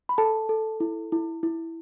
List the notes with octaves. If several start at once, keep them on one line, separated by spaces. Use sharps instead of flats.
B5
A4 A5
A4
E4
E4
E4